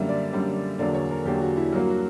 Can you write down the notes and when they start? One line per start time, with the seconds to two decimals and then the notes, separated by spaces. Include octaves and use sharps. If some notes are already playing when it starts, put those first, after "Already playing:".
Already playing: F#2 D3 G3 A#3 E5
0.09 D5
0.32 F#2 D3 G3 A#3
0.79 E2 D3 F#3 A#3 D5
0.94 C#5
1.11 A#4
1.25 E2 D3 F#3 A#3 G4
1.41 F#4
1.57 E4
1.72 G2 F#3 A#3 F#4
1.90 F#4